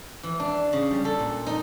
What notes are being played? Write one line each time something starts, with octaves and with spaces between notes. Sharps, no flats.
E3
D4
C#3
G3
A4
A#2
D#4